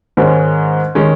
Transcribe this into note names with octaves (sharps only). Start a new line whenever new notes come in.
G#2 D#3 G#3 C#4
D#3 G#3 C#4